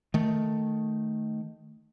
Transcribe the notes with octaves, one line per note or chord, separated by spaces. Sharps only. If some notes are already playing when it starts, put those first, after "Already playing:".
D#3 A3